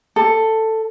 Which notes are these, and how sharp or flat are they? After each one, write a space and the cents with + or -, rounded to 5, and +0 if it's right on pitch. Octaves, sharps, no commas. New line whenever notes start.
A4 +10